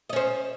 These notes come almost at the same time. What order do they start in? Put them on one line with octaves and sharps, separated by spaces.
D#5 C#4 C5